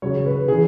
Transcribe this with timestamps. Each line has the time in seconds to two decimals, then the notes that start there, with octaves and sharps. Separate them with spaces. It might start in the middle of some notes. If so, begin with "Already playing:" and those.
0.02 C#3 F#3 C#5
0.26 B4
0.48 C#3 E3 G#4